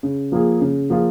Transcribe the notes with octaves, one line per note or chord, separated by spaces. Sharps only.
C#3
F3 A#3 F4 G#4
C#3
F3 A#3 F4 G#4